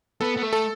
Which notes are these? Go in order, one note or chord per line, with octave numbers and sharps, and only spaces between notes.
B3 A4
B3
A3
A4